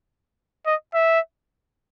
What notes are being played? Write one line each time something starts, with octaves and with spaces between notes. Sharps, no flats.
D#5
E5